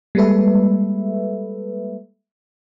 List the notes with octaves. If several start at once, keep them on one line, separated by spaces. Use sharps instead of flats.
G3 G#3 A#3 A4 B4 E5